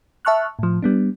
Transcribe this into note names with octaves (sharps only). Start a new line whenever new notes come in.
E5 A5 C#6 F6 F#6
A2 F3
G3 B3 D4